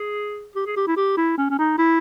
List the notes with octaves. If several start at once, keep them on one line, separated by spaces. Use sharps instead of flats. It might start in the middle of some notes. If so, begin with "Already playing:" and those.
Already playing: G#4
G4
G#4
G4
E4
G4
E4
C#4
C#4
D#4
E4